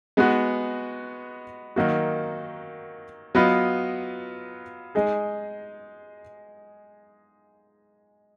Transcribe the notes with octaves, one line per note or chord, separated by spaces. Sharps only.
G#3 B3 D#4 F#4
D#3 F#3 A#3 D#4 F#4
F#3 B3 F4 B4 D#5
G#3 D#4 G#4